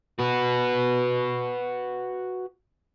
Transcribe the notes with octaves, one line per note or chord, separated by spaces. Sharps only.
F#4 B4